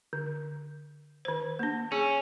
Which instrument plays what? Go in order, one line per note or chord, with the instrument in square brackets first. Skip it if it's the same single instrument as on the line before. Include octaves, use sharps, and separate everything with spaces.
[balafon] D3
D#3 C5
A#3 D4
[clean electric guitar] C#4 [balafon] G#4